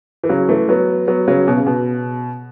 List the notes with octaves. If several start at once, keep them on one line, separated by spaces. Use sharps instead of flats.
E3
C#3 F#3
E3 A3
F#3 B3
F#3 B3
C#3 F#3
B2
C#3
B2